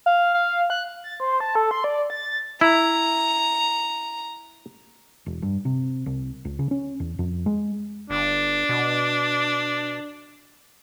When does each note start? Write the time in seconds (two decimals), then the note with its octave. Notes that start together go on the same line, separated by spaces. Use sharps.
0.06 F5
0.34 F5
0.70 F#6
1.04 A6
1.20 C5
1.40 A5
1.55 A4
1.71 C6
1.84 D5
2.10 A6
2.61 E4 A#5
5.26 E1
5.42 G2
5.65 C3
6.06 C2
6.45 C#2
6.59 C#3
6.71 C#4
7.00 E2
7.19 F2
7.46 G#3
8.10 G1 D4
8.69 B2